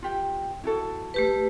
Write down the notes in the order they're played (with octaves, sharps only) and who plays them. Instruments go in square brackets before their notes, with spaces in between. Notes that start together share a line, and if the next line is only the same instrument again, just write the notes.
[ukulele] F4 G4 G5
E4 F#4 A4
[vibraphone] A3 G4 B4